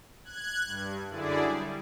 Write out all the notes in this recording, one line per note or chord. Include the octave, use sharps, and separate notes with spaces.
F#6 G#6
G2
F#2 D3 E4 G#4 D5
G3